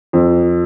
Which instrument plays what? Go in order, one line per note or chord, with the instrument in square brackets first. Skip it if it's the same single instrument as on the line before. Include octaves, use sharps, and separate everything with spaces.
[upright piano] F2